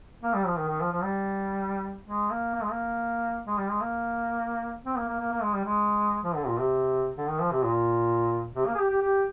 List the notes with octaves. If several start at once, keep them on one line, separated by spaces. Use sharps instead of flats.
A#3
G3
F3
D#3
D#3
F3
F3
G3
G#3
A#3
A#3
G#3
A#3
G#3
G3
G#3
A#3
C4
A#3
A#3
A#3
A#3
G#3
G3
G#3
F3
D3
A#2
C3
D3
D#3
F3
C3
A#2
C3
A#3
G#4
G4
G4
G4